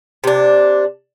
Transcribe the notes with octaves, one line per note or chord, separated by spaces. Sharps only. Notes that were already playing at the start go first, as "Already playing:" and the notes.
C3 D4